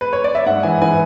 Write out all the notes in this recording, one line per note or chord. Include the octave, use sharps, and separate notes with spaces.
B4
C#5
D5
E5
G#2 F#5
E3 G#5
E3 G#5